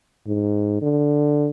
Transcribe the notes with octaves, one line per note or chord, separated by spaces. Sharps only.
G#2
D3